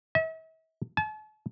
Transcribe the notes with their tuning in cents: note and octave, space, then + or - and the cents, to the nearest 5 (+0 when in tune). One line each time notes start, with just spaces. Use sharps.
E5 -40
A5 -40